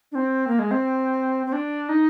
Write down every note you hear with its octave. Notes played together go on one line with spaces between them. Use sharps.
D4
C4
A#3
G#3
C4
C4
D4
D#4